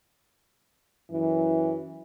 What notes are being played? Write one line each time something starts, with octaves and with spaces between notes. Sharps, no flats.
F#2 E3